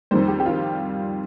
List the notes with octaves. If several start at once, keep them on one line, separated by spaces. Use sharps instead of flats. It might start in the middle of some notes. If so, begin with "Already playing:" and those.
F2 D#3 G3 C5
G4
G4
D#3 F4